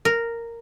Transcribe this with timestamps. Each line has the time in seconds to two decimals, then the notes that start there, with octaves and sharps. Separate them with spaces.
0.05 A#4